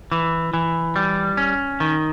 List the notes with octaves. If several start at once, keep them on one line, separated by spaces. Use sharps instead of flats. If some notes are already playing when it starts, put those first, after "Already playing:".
E3
E3
G3
C#4
D#3